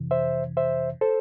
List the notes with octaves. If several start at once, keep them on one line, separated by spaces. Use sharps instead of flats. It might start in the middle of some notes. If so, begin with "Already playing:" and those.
Already playing: F2 C3 E3
C5 E5
C5 E5
A4 C5